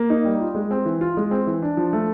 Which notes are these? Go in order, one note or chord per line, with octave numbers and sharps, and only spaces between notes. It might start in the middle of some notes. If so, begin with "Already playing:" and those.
Already playing: A#3
D#4
G3
F4
G#3
C4
E3
F4
G#3
C4
E3
D4
F3
A3